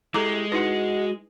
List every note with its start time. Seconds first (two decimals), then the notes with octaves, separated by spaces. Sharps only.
0.14 G#3 E4 G4 A4 A#5 D6
0.52 D#4 E4 F#4 B4 D#5 F#5